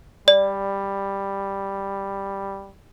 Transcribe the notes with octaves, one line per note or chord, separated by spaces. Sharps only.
G3 D5